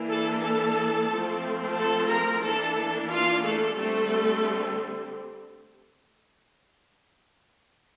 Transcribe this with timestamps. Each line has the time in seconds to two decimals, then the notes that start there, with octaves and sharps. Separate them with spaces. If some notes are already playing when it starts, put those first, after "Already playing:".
Already playing: E3 A#3 D4
0.09 A4 A5
0.43 A4 A5
1.11 F3 A3 C4
1.77 A4 A5
2.10 A#4 A#5
2.44 E3 A#3 D4 A4 A5
3.10 F4 F5
3.44 A3 A4
3.77 D3 G3 A3 C4 A4